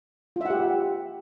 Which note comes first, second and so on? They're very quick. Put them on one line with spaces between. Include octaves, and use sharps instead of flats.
F4 E5 F#5 G4